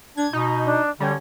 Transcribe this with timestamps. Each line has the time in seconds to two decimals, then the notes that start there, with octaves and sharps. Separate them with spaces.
0.17 D4 G#6
0.33 B2 D#4
0.65 D4
1.00 D3 G3 C#4